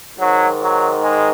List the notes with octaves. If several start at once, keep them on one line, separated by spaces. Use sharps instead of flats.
G#2 D#3 F#3
F#3
G#3